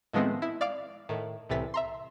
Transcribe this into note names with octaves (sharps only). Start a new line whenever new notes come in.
A2 D#3 F3 G#3 B3 C4
E4
D5 F5 D6
A2 D#3
C2 A2 C3 E3 A6 B6
E5 A#5 C6